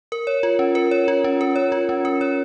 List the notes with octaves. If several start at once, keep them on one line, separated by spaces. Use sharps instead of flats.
A#4
C#5
F4
C#4
A#4
C#5
F4
C#4
A#4
C#5
F4
C#4
A#4
C#5